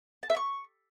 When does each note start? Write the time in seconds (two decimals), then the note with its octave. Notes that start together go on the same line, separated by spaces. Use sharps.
0.23 A5
0.30 E5
0.37 C#6